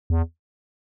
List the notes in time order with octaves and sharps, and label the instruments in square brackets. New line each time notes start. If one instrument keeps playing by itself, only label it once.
[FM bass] E2